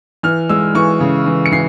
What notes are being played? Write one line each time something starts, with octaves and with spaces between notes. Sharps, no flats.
E3 F6
G#3 E6
E3 C#6
C#3
E3
C#7
E3 C7